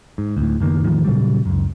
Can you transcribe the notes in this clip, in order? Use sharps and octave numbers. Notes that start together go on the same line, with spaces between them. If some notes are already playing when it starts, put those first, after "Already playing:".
G#2
D2 A2
F#1 D#3 A#3 B3
E2 A2 D#3 F3
A#2 C#3 F#3 G3
C#2 F#2